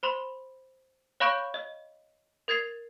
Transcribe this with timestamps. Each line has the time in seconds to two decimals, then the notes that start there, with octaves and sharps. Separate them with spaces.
0.03 C5 B5 C6
1.20 C#5 F5 B5 C#6 G6 D7
1.54 D#5
2.48 A#4 G#6 A6 C7 F7